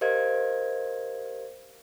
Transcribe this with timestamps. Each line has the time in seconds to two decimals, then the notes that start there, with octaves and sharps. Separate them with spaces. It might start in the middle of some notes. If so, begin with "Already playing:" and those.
0.01 G4 A#4 C5 D#5 F5 G#6